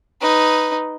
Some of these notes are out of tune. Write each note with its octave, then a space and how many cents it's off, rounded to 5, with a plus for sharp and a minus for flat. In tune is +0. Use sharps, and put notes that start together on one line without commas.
D#4 +0 B4 +10